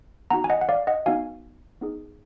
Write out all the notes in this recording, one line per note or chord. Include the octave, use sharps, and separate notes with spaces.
B3 D#4 F#4 F#5 A#5
G#5
D#5 F#5
F#5
D5 F5
D#5 F#5
B3 D#4 F#4 F5 G#5
B3 D#4 G#4